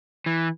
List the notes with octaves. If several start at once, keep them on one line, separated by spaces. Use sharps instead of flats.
E3